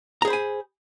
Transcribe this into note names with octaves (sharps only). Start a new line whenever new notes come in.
G#4 C5 G#5 A#5 B5